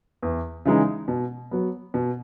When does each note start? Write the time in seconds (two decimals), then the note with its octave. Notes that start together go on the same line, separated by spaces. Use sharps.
0.22 E2
0.65 C#3 E3 G#3 D#4
1.08 B2
1.51 F#3 B3
1.94 B2